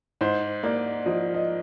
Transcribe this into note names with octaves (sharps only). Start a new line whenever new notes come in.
G#2 C5
A#3 D5
F3 D#5
D#5